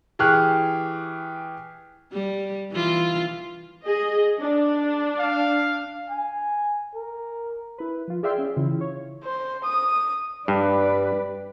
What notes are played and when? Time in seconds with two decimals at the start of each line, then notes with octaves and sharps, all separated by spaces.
0.19 E3 G4 G#4 C#6 F6 F#6
2.13 G3
2.72 E3 F4
3.85 G#4 D#5
4.40 D4
5.19 F5
6.10 G#5
6.95 A#4
7.78 E4 B4
8.08 F3 F4
8.23 G#4 D5 E5 F5 G5 C6
8.35 C#4 G#4
8.56 C#3 E3 E4 F4
8.81 C#5
9.24 C5
9.64 D#6
10.48 G2 B4 D5